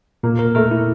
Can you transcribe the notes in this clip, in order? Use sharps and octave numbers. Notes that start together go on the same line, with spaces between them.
A#2 A#3
A#4
A3 A#4
E4